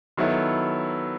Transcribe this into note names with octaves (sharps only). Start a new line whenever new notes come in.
D#3 F#3 B3 E4 A4